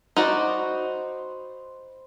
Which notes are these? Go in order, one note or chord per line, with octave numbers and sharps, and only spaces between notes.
D#4 F#4 C5 D5 B5